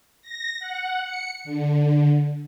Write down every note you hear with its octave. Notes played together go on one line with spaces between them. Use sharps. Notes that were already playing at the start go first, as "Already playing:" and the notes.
A#6
F#5
C#7
D3